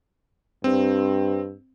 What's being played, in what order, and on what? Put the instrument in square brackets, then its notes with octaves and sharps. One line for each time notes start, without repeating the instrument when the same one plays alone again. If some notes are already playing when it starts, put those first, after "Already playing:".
[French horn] G2 [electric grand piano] C4